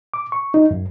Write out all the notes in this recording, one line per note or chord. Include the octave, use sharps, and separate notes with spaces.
D6
C#6
D#4
F#2